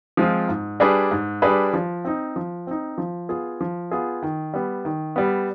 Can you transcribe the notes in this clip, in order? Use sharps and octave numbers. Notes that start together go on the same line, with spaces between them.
F3 G#3 C4 F4
G#2
G3 D4 G#4 B4
G#2
G3 D4 G#4 B4
F3
C4 D#4
F3
C4 D#4
F3
B3 F4 G#4
F3
B3 F4 G#4
D#3
G3 B3
D#3
G3 B3